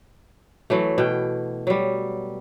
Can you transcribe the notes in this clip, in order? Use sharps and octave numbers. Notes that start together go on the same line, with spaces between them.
E3 F#3 A3
B2 G5
F#3 G3